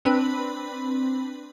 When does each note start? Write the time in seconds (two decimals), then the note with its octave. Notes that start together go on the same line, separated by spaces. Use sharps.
0.05 C4 D4 B4 B5